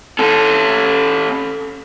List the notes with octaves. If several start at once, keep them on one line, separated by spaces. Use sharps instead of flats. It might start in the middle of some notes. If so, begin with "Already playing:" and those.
C#4 A4